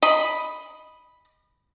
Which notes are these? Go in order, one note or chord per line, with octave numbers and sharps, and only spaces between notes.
D#5 B5